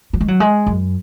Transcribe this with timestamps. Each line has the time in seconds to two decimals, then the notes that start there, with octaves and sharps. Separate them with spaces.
0.13 F#3
0.21 G#3
0.28 F#3
0.40 G#3
0.67 F#2